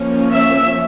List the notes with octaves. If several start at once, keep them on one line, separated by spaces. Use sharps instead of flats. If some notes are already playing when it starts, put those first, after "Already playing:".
Already playing: F3 A#3 C#4
E5